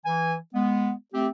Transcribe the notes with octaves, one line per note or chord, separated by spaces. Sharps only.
E3 G#5
G#3 B3
A3 C4 G4